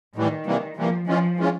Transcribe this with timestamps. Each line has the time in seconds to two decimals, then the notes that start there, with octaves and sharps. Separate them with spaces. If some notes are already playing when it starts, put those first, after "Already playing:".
0.16 A2 D#3 E3 G3
0.46 C3 E3 G3 A#3
0.77 C3 E3 F3 G3 A#3
1.07 E3 F3 G#3 C#4 F4
1.37 E3 G#3 C#4 F4